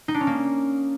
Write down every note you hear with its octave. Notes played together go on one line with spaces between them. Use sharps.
D#4
D4
C#4
A#3